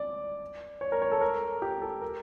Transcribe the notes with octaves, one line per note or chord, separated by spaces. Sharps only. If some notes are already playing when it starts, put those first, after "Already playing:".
Already playing: D5
C#5
A#4
C#5
A4
A#4
G4
A4
A#4